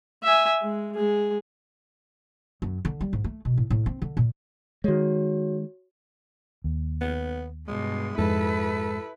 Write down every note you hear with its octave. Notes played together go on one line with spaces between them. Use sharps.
E5 G#5
G#3
G#3 G#4
F#2
D3
G3
G#2
A3
B2
A2
A2
C4
D3
A#2
D#3 G#3 F#4 C#5
D#2
B3
G2 B2 G#3
F2 G#2 G#3 E4 A4 B4